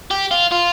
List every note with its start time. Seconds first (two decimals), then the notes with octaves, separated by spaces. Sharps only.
0.11 G4
0.31 F4
0.51 F4